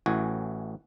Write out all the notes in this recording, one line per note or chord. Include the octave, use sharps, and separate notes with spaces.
A1 A2 E3 F#4 G#5